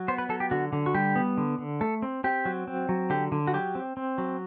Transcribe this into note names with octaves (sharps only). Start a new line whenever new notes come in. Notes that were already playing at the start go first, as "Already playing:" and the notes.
Already playing: F#3
B3 C5
B4
F#3 A4
G4
D3 F#4
D3
F#4
G3 G4
B3
D3
D3
A3 A4
C4
C4 G4
F#3
C4
F#3
D3 G4
D3
F#4
F#3 G4
C4
C4
F#3